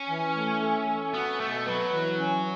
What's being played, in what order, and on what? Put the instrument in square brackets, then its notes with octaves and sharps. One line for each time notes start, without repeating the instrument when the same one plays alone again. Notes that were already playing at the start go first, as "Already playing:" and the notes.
Already playing: [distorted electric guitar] C#4
[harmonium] E3
A3
A4
A4
[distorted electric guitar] B3 [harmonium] F#4
[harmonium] B2 [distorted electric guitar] A3
[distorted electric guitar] F#3 [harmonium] B4
[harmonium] E3
C#4